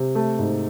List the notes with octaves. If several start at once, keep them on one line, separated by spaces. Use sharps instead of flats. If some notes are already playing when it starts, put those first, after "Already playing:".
Already playing: C3
A3
G#2